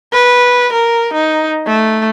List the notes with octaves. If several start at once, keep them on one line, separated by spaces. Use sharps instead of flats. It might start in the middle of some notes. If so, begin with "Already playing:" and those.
B4
A#4
D#4
A3